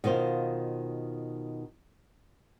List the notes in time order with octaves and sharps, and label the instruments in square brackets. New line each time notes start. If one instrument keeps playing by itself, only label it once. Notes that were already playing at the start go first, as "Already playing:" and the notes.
[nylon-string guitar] B2 D#3 F4 C5 F5